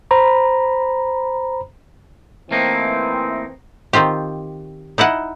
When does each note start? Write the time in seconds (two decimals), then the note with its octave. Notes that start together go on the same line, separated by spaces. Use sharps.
0.11 C5 A#5 B5
2.51 E3 A3 A#3 C4 D#4
3.93 D#3 C4 F4 G4
4.98 D#4 E4 D#5 F#5